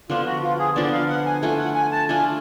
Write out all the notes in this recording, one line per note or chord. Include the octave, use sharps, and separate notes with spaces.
D3 F3 B3 D4 F4
F#4
F4
G#4
D3 F3 B3 D4 D5
F5
F#5
G#5
A3 D4 F4 G#5
F#5
G#5
A5
A3 D4 F4 G#5